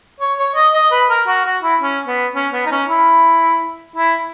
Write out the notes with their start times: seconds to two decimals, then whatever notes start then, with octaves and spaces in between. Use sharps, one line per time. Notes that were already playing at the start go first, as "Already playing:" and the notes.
0.20 C#5
0.38 C#5
0.55 D#5
0.74 D#5
0.91 B4
1.09 A#4
1.27 F#4
1.45 F#4
1.63 E4
1.81 C#4
2.07 B3
2.34 C#4
2.52 B3
2.66 D#4
2.71 C#4
2.89 E4
3.96 E4